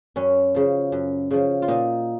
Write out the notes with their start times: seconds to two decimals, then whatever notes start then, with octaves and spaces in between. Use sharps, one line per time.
0.16 F#2 C#4
0.55 C#3 F3
0.92 F#2
1.31 C#3 F3
1.62 F4
1.68 A#2 D#4